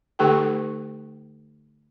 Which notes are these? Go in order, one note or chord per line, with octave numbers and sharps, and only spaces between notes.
D3 A3 D#4 G4 A4 G5